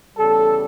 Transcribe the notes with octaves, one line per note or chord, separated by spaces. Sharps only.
E2 C#3 G3 A4